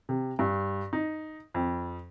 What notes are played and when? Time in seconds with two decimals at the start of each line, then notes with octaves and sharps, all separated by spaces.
0.09 C3
0.39 G2
0.93 D#4
1.54 F2